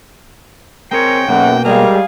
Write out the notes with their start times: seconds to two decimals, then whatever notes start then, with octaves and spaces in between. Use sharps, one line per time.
0.91 G#3 C4 A#4 C#5 G5
1.28 B1 F#2 B2 A#3 F#5
1.65 G3 G#3 G#4 A#4 F5